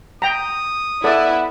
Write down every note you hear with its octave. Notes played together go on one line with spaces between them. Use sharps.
G5 A#5 D#6
B3 E4 A4 D5